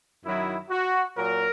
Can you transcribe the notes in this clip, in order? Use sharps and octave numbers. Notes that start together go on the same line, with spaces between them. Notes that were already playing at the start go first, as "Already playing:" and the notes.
F#2 D#3 F#3 E4
F#4
A#2 F#3 A#4